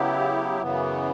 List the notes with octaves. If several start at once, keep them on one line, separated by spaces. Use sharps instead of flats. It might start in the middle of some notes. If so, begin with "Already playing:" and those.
Already playing: C#3 F#3 B3 E4 G4
F#2 C#3 E3 B3